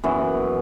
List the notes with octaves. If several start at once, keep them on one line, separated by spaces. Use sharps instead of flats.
F#2 E3 B3